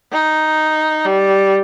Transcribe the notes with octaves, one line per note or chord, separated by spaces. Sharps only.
D#4
G3